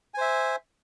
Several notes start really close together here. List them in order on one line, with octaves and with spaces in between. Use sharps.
G#5 C5 E5